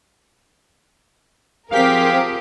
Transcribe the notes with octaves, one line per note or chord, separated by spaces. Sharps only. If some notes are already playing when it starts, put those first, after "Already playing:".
F3 C4 G4 G#4 A#4 F5 G5 B6